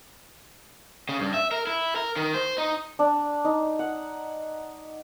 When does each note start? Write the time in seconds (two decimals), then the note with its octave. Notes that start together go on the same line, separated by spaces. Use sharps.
1.09 C#3
1.21 G2
1.34 E5
1.51 A#4
1.67 E4
1.96 A#4
2.16 D#3
2.34 C5
2.58 D#4
2.99 D4
3.45 D#4
3.79 F#5